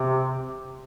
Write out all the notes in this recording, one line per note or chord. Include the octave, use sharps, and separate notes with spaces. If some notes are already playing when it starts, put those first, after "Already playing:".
Already playing: C3